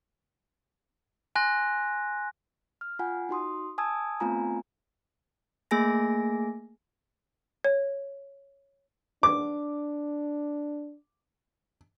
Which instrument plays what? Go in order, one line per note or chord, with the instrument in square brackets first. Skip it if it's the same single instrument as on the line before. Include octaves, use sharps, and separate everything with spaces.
[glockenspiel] G#5 C6 F#6 A#6
[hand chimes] F6
F4 F#5 G#5
D#4 F#4 C6 D#6
G#5 A5 D#6 E6 G#6
A3 B3 C4 F4 G#5 A#5
A3 A#3 G#4 G#5 A#6
[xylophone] C#5
[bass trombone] D4 [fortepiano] D6